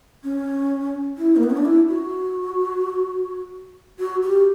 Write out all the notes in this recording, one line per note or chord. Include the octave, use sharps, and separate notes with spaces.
C#4
E4
A#3
B3
C#4
D4
E4
F#4
F#4
G4